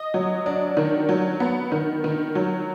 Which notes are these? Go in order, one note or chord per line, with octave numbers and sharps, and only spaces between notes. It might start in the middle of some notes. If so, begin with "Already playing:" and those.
Already playing: D#5
F#3
D4
D#3
F#3
B3
D#3
D#3
F#3